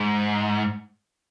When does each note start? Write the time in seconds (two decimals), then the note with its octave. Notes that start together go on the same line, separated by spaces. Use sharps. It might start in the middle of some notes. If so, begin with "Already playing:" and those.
Already playing: G#2